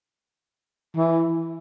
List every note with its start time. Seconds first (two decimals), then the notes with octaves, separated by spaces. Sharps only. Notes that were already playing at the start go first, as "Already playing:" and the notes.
0.96 E3